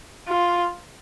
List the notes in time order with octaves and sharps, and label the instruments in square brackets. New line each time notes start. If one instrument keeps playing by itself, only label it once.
[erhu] F4